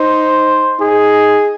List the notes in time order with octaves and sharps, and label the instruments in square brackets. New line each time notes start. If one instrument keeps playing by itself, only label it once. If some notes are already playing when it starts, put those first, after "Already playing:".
Already playing: [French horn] D#4 [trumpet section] C5
[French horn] D#4 [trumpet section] G#4